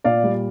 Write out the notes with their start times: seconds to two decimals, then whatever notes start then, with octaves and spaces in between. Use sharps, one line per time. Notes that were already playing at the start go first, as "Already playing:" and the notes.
0.04 A#2 D5 F5
0.23 G3